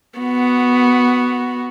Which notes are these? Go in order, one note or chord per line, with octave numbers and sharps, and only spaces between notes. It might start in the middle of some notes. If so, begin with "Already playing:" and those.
B3 F#4